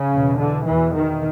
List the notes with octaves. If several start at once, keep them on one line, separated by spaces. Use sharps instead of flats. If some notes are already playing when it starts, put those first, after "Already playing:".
Already playing: C#3
E2 B2
D3
E2 B2 E3
D#3